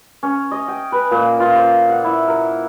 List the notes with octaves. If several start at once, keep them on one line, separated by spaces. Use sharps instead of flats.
C#4
D#5
G5
B4
A#2
F4
C5
F#5
E4
A#4